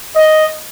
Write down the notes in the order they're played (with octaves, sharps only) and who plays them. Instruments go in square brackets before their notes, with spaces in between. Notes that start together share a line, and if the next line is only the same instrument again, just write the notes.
[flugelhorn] D#5